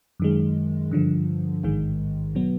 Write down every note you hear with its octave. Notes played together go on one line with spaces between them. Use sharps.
F#2 D#3 G#3
G2 D3 F3
A1 G#2 D#3 G#3
B2 F#3 B3